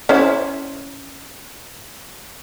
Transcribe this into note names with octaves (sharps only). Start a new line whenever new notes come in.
C#4 E4 C5